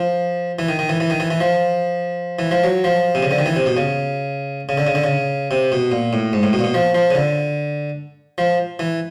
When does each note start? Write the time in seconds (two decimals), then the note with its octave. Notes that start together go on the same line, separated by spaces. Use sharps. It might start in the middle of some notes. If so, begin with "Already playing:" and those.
Already playing: F3
0.59 E3
0.69 D#3
0.79 D#3
0.89 E3
1.00 E3
1.10 D#3
1.20 E3
1.30 E3
1.40 F3
2.39 E3
2.51 F3
2.64 F#3
2.84 F3
3.15 C3
3.23 C#3
3.31 D3
3.39 D#3
3.46 E3
3.56 C3
3.66 B2
3.77 C#3
4.69 C#3
4.78 D3
4.87 C#3
4.95 D3
5.04 C#3
5.51 C3
5.72 B2
5.92 A#2
6.13 A2
6.33 G#2
6.43 A2
6.53 B2
6.59 A#2
6.64 B2
6.74 F3
6.95 F3
7.11 C#3
7.15 D3
8.38 F3
8.79 E3